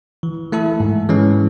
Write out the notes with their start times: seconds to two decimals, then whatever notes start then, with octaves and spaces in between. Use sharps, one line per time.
0.23 E3
0.52 A3 E4 A4
0.80 G#2
1.09 E3 G#3 C#4